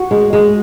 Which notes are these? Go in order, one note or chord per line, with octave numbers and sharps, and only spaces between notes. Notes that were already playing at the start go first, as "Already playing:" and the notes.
Already playing: F#4
G#3
G#3